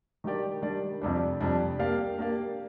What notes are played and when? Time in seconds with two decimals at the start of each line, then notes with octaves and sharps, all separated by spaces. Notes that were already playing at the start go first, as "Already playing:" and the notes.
0.24 D#3 G3 D4 G4 D5
0.62 D#3 G3 D4 G4 D5
1.02 F2 C3 G3 D4
1.40 F2 C3 G3 D4
1.79 A#3 D4 G4 D5 F5
2.18 A#3 D4 G4 D5 F5